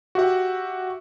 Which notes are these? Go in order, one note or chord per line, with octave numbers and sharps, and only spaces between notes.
F#4 G4 E5 F#5